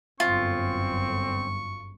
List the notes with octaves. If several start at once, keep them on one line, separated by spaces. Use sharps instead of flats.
G1 F#2 C4 F4 C#6